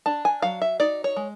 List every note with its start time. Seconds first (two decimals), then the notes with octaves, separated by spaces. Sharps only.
0.06 D4 A5
0.25 G#5
0.42 F#3 F5
0.62 E5
0.80 D#4 D5
1.04 C#5
1.17 G#3